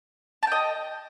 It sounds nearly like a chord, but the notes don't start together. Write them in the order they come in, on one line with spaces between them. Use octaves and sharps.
A5 G5 D#5